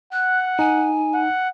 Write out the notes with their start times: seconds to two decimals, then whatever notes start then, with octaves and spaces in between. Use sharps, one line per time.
0.13 F#5 F#6
0.59 D#4 G#5
1.14 F#5